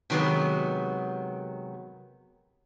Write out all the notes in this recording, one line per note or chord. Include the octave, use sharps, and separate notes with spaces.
C3 D#3 F#3 G#3 B3